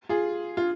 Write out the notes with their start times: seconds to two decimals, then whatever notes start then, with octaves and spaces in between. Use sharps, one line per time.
0.09 F4 G#4
0.57 F4